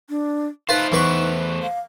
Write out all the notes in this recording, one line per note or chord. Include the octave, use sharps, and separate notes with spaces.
D4
A3 D#4 F4 B4 C5
E2 B4 C#6
F5